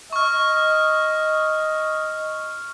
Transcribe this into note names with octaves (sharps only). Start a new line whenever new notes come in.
D#5 C#6 F6